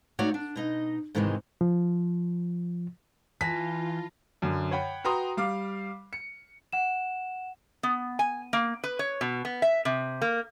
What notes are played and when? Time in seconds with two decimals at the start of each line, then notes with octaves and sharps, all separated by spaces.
0.19 A3 D#4 F#4 C#5 D5 F#5
0.34 D4
0.56 B2 D#4 D#5
1.15 G#2 C3 D#3 E3 G3 G#3
1.61 F3
3.41 E3 F4 A5 B5 A#6 B6
4.42 F#2 D3
4.71 C#5 F#5 G5 B5
5.04 F#4 B4 G5 A#5 C6 D#6
5.37 G3 F5 D6
6.13 C#7
6.72 F#5 E7
7.83 B3
8.19 G#5
8.53 A#3
8.84 B4
8.99 C#5
9.21 B2
9.45 B3
9.62 E5
9.85 C3
10.22 A#3